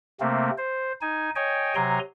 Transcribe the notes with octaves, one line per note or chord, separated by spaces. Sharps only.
C3 A3 A#3 C4
C5
D#4 G#5
C#5 D#5 G5 G#5
C3 F#3 G#5 A#5 C6